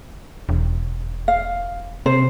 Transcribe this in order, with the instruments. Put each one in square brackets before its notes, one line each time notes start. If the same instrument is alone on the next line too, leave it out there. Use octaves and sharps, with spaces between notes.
[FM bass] E1
[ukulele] F5
[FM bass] C3 [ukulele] C5